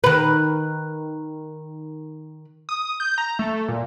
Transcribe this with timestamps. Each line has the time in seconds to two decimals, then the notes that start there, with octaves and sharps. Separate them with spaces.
0.04 D#3 B4
2.69 D#6
3.00 G6
3.18 A#5
3.39 A3
3.68 A#2